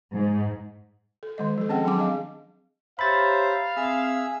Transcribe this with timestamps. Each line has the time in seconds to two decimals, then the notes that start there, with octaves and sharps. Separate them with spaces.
0.13 G#2
1.23 A4
1.38 D#3 G#3 D#5
1.58 F3 A4
1.69 C4 C#4 G#4 D#5 F#5 G5
1.85 F#3 D4 G#4 G#5 A5 D6
1.98 C4 G#4 D#5 F5
2.99 G4 C5 C#5 E5 F5 A#5 B5 A6
3.77 C4 G#4 E5 E6